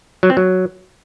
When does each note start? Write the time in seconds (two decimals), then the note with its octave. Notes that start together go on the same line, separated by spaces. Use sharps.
0.23 F#3
0.30 C4
0.37 F#3